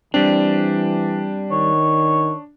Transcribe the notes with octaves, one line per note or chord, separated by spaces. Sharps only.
E3 G3 C4 D4
D#3 C#5